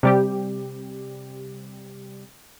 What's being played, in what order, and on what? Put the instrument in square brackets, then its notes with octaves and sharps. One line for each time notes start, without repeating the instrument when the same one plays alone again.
[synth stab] C3 G3 G4